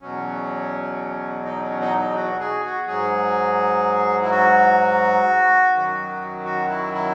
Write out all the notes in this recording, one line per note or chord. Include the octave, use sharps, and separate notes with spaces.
E2 B2 F#3 C#4
D#4
C#4
D#4
D#4
F#4
G#4
F#4
G#2 F#3 G#4
E4
F#4
F#2 D#3 F#3
F#4
E4
E4